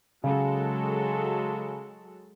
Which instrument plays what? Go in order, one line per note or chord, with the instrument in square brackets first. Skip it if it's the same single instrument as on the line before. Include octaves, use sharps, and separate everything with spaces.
[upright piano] C#3 [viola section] F#3 G#3 A4